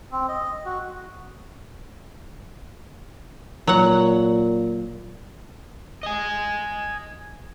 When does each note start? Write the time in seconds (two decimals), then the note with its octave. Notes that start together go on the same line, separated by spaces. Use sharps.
0.12 C4
0.29 D#5
0.65 F#4
3.67 A#2 F#3 F#5
6.03 D#5 G#5